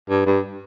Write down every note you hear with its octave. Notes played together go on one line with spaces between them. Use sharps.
G2
G2